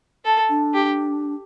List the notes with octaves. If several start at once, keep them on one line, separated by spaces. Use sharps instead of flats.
A4
D4
G4